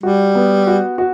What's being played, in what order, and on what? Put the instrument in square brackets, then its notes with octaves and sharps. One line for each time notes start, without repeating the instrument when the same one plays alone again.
[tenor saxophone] G3 [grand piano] F#4
[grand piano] B3
F#4
F#4